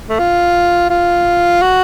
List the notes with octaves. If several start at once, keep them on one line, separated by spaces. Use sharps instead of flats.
A3
F4
F4
F#4